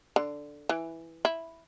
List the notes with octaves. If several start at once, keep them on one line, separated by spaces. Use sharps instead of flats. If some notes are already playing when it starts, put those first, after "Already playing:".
D3
E3
E4